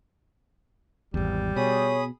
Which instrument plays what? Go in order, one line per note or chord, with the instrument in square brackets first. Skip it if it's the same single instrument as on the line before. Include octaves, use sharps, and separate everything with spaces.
[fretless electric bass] G#1 E2 [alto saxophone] G3
[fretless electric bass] B2 [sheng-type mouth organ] G#4 B5 D#6 [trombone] C#5